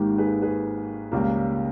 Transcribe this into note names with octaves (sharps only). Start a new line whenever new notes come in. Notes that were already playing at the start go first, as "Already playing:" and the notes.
Already playing: G#1 G#2 D#3 A#3 G4
G#4 B4
G#4 B4
C#2 C#3 G3 A#3